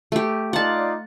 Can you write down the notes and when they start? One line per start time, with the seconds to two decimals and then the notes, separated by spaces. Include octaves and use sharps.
0.12 A3 G4
0.53 D#4 F4 D5 F#5 A5